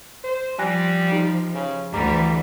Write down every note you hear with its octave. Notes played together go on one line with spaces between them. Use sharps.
C5
F3 G3 G#5 F#6 A#6
D#4 G4
C#3
D2 D3 E3 G3 A#5 D6